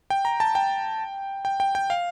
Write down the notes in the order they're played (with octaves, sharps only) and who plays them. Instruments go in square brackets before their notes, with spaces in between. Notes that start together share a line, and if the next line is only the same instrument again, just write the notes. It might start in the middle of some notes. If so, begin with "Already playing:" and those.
[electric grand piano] G5
A#5
A5
G5
G5
G5
G5
F5